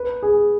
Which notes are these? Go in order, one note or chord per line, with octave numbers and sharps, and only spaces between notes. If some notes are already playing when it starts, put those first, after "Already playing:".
Already playing: B4
G#4